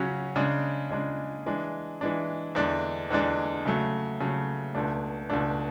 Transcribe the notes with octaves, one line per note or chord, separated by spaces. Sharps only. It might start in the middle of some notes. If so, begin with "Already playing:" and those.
Already playing: C#3 F#3 C#4 F#4
C#3 G#3 D4
C#3 G#3 D4
E3 G#3 D4
E3 G#3 D4
E2 D3 G#3 D4
E2 D3 G#3 D4
C#3 F#3 A3
C#3 F#3 A3
C#2 B2 A3 D4
C#2 B2 A3 D4